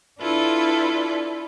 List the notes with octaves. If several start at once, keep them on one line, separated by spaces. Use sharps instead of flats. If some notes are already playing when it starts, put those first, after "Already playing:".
D4 E4 F4 A4 B4